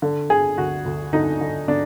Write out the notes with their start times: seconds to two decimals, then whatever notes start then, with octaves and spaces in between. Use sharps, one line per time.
0.02 D3
0.30 D3 G#4
0.58 D2 F#4
0.86 D2
1.13 D3 D#4
1.41 D3
1.68 D3 D4